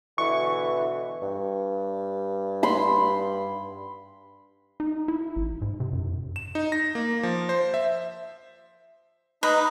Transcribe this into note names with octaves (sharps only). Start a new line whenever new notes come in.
B2 D3 E3 C#6
G2
B5 C6
D#4
E4
A1
G#2
C3
F#2
E7
D#4
A#6
A#3
F3
C5
E5
D#4 B4 A#5